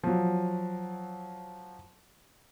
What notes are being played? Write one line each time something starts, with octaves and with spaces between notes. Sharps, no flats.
F3 F#3